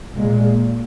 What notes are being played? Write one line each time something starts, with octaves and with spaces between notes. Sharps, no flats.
A#2 G#3